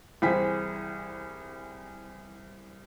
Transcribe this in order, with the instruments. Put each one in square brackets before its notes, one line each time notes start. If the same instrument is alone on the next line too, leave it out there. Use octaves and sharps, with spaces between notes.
[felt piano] C2 E3 G#4 C5 G5 B6